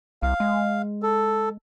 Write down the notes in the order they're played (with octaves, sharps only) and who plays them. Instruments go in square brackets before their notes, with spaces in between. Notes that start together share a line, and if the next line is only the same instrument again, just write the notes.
[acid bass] C2 [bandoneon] F5
[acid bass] G#3
[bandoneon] A4